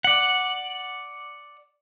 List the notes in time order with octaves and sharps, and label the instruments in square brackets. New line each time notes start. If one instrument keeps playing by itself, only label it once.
[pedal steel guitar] D5 F#5